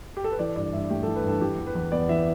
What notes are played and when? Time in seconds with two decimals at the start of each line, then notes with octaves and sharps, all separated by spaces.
0.17 G4
0.24 A4
0.32 B4
0.39 E3 D5
0.56 G2 D5
0.73 G2 E5
0.90 A3 G4
1.03 A4
1.07 E3
1.16 B4
1.24 G2 A4
1.41 E3 G4
1.58 E2
1.66 B4
1.75 E2
1.92 B3 D5
2.09 E3 E5